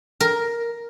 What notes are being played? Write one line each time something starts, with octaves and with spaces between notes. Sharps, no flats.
A#4